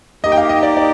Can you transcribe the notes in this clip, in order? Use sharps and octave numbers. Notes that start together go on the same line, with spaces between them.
A#3 D#4 G4 D#5
G5
F5
D#5
D5
D5